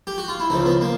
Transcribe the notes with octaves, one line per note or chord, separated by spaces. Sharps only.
G4
F#4
F4
E4
C#2 C#3 F3 D#4
B3
F3 A#3